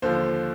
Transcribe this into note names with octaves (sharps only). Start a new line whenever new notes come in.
D#2 D3 F3 C5